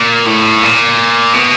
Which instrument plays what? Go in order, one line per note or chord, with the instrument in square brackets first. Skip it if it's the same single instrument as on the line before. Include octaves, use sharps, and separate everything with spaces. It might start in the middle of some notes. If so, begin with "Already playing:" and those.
Already playing: [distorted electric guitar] A#2
A2
A#2
B2